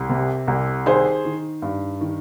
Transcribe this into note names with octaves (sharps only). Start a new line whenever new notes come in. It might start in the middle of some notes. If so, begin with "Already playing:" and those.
Already playing: C2
C3
C2
D#3 G#4 C5
D#3
G2
D#3